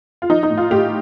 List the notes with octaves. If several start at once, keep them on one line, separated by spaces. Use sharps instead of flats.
F4
F3 D#4
D#4
A2
F4
A2 G4